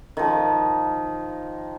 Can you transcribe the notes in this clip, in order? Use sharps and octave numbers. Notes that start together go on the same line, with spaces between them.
D#3 F3